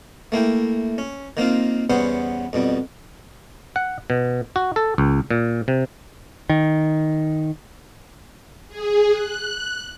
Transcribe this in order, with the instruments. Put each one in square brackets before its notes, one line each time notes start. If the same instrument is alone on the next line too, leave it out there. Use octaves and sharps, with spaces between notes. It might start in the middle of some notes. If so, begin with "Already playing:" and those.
[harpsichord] A3 A#3 E4 G5
C#4
D#3 A#3 C4 F4
E2 G3 B3 C#4 C5 F#5
F2 B2 G3
[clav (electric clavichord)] F#5
B2
F#4
A4
C#2
A#2
C3
[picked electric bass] D#3
[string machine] G#4
F#6